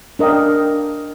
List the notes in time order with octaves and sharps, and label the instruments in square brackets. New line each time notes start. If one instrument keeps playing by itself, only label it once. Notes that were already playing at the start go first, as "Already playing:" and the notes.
[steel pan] D4 A#4 D#5 F5 G5